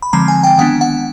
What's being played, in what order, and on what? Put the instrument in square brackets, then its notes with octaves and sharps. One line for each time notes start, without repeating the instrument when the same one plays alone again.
[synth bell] B5
D3 F3 G#3 C4 A#5
G#5
G5
D#3 G#3 B3 D4 F#5
F#5